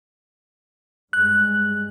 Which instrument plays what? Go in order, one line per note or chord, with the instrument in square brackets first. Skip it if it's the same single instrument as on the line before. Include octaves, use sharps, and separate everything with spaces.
[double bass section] G2 G#3 [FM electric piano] F#6